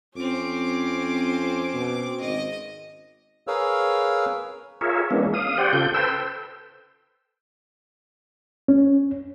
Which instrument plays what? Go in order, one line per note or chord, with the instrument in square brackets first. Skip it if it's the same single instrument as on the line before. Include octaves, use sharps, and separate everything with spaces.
[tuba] F2 [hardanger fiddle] C4 D6 [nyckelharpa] C#4
[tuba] B2
[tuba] G#1 [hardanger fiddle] D#5
[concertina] G#4 A#4 B4 C#5 F5 E6
[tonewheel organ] F4 G#4 A#4 C#5 E5
E3 G#3 A#3 B3 C#4 D4
F5 D#6
G4 C5 D5 F#5 G5
C#3 F4 A4 G6
A4 B4 C5 G5 E6
[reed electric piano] C#4